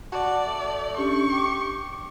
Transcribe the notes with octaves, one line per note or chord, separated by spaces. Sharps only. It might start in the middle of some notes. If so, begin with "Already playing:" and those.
F#4 D5 A5
A3
C#4 D4 G4 C#6
G4 D6